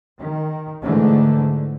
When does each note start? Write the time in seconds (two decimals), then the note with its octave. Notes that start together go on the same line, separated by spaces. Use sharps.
0.18 D#3
0.82 G#2 D3 E3 A3